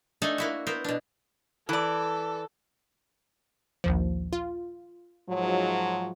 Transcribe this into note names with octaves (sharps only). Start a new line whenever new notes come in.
A3 D4 D#4 A4 G#5
A#3 E4 F#4
B3 A#4 C5
B2 D4
E3 A4 D5
A#1 D#2 F3
F4
G#2 F3 F#3